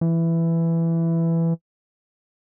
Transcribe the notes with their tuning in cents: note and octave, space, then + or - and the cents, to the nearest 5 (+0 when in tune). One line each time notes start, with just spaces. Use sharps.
E3 +10